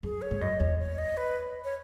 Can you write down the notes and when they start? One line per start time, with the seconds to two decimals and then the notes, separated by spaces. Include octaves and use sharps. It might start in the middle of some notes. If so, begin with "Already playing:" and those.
0.03 F#2 G#4
0.22 C#5
0.31 G#2
0.41 F#2 D#5
0.60 E2 C#5
0.79 C#5
0.98 D#5
1.17 B4
1.64 C#5